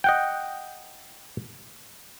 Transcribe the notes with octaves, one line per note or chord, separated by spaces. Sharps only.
D#5 F#5 G5